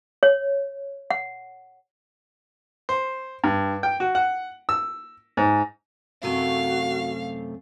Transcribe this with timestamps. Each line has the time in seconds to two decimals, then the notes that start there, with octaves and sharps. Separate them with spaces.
0.23 C#5
1.10 F#5
2.89 C5
3.44 G2
3.83 G5
4.00 F#4
4.15 F#5
4.69 E6
5.37 G#2
6.23 F#2 C3 A3 F#4 F5